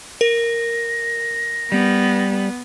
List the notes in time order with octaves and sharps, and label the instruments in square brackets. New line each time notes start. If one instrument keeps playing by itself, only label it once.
[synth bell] A#4 [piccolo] A#6
[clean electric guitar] G3 [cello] B3